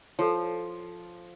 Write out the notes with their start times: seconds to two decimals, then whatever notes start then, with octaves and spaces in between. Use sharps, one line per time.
0.19 F3 A4 C#5